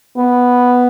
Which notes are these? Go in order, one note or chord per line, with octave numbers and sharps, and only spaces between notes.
B3